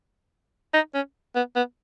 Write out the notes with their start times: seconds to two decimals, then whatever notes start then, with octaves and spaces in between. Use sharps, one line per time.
0.74 D#4
0.94 C#4
1.35 B3
1.56 B3